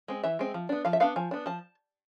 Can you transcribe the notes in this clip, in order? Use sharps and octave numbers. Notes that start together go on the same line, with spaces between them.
G#3 C4
E3 E5
G#3 C4
F3
B3 D4
F3 F5
E5
B3 D4 F5
F3 G#5
B3 D4
F3 A5